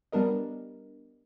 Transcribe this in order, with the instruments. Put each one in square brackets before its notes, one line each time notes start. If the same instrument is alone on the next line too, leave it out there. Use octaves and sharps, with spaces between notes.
[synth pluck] G3 B3 D4 A#4 D#5